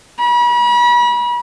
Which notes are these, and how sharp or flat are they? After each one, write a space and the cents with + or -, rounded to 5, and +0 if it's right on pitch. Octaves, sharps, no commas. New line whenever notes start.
B5 -40